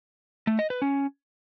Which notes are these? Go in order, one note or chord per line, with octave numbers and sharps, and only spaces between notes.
A3
D#5
B4
C#4